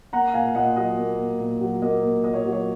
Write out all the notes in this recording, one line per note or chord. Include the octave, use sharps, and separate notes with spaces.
A#3 F#5 A#5
A#2 F5 G#5
A#2 D#5 F#5
F#3 D#5
A#3
A#2
A#2
F#3
A#3 D#5
A#2
A#2 D#5
C#5
F#3
C#5